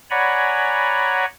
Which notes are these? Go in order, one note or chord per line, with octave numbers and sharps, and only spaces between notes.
C#5 D5 F#5 G#5 A#5 B5